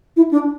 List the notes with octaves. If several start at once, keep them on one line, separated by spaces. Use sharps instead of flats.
E4
D4